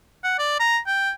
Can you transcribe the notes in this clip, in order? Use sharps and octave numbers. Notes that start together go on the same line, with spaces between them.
F#5
D5
A#5
G5